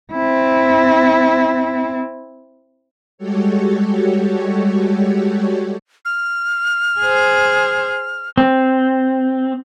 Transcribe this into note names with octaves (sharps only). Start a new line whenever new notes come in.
C4 E4
G3 G#3 F#4 G4 A4 C#5
F6
G#4 C5
C4